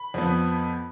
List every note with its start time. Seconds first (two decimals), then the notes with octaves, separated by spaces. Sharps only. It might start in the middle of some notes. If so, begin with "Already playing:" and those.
Already playing: B5
0.14 F2 F3 B3